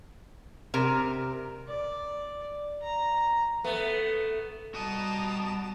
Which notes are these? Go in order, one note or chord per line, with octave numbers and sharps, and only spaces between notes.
C3 A#4
D5
A#5
A3 B3
G3 F#4 D#5 A5 A#5 D#6